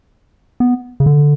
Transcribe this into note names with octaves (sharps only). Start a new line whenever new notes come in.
B3
C#3
D3